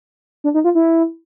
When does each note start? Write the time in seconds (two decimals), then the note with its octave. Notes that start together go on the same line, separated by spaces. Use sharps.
0.44 D4
0.54 D#4
0.64 F4
0.75 E4